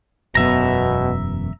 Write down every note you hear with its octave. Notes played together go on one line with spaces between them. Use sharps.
E1 F#2 B2 B3 E5 A#5